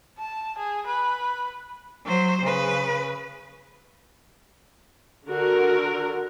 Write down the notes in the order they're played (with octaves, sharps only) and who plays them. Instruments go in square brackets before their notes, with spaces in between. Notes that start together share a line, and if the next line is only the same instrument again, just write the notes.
[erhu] A5
G#4
B4
[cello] F#3 C5
C#3 B4
[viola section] D3 F#4 A#4